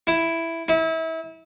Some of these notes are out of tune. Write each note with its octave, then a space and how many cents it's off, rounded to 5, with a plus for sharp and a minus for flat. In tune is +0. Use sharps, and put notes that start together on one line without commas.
E4 +5
E4 -30